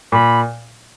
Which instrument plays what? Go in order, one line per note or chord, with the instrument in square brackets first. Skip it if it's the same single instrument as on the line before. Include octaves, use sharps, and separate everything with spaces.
[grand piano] A#2 [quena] B5